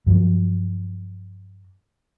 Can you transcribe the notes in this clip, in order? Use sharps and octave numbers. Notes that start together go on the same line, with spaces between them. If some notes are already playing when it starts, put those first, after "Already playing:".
G2 F3 F#3